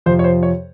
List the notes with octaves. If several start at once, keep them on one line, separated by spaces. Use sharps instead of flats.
F2 C3 F3 C5
C#5
C5
C#5